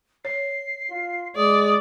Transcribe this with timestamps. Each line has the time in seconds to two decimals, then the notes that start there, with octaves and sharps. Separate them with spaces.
0.25 C#5 C7
0.91 F4
1.36 G#3 D5 D#6